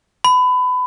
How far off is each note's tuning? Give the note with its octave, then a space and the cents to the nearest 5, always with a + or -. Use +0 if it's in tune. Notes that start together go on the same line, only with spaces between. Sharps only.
B5 +25